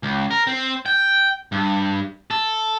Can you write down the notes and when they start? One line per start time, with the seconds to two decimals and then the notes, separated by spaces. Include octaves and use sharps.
0.03 C#2
0.31 A#4
0.47 C4
0.86 G5
1.52 G2
2.31 A4